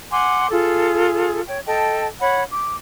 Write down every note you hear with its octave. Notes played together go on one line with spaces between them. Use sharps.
F#5 G#5 C6 D6
F4 G#4 A4
C#5 G5
A4 D#5 G5 A5
C#5 F#5 B5
D6